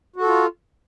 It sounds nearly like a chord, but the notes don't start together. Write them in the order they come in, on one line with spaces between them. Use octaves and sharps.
F#4 A4 F4